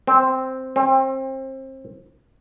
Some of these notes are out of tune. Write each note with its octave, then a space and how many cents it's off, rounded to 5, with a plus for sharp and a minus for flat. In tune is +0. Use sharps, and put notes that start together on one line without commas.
C4 +0
C4 +30